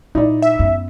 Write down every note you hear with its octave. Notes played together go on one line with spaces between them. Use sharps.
A#2 D#4 E4 D5
E5
F#2 B3